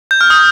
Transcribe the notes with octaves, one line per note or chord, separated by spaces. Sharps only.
G6
F6
D#6